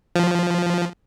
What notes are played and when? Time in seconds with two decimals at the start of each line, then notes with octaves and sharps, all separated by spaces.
0.16 F3